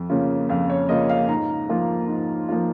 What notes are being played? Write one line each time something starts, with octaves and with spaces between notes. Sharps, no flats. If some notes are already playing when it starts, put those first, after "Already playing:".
Already playing: F2
C#3 A#3 C#4 F4
F2 F5
C#5
C#3 A#3 C#4 F4 D#5
F5
G#2 A#5
F3 A#3 F4
G#2
F3 A#3 F4